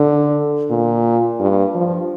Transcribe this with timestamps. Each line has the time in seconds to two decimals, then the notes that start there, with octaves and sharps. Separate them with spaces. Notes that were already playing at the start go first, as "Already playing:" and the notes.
Already playing: D3
0.70 A#2
1.40 G2
1.75 F3